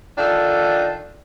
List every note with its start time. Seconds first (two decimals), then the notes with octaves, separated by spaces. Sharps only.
0.17 D#3 D4 F4 A4